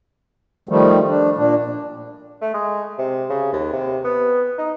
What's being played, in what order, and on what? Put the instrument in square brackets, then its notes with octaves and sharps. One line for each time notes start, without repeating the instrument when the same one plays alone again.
[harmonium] D#3 F3 G3 A3
D4
A#2 D4
[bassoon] A3
G#3
C3
C#3
D#2
C3
B3
D#4